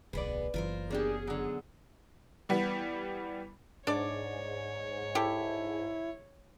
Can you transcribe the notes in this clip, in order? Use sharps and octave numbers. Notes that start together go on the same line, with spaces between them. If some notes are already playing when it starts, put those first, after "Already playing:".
D1 B1 B3 G#4 B4 D5
F#1 E3 F4 A#4 C5
B2 A#3 C#4 D4 G4 G#4
D3 F#3
E3 G3 B3
G#2 D4 C#5 D5
E4 G4 A4